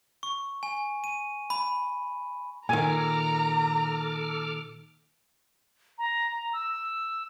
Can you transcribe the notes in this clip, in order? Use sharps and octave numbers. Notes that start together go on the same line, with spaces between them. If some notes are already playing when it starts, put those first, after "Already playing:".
C#6
G#5
D#7
B5
A#2 D#3 A4 G#5 A#5 D6 F6
A#5
E6